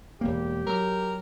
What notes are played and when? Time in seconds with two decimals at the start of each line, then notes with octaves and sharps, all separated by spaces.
0.21 E1 A#3 G4
0.67 F#3 A#4